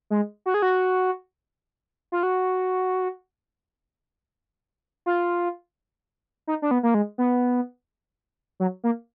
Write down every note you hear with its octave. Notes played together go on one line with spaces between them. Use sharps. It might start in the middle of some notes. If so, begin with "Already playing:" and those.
G#3
F#4
G#4
F#4
F4
F#4
F4
D#4
D4
B3
A#3
G#3
B3
F#3
A#3